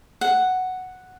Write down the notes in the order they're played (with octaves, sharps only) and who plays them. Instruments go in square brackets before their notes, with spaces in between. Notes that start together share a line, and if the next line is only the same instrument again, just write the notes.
[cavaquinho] F#5